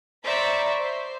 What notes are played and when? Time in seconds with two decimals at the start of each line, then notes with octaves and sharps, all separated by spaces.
0.25 C5 D5 E5 A#5 B5 C#6
0.81 C5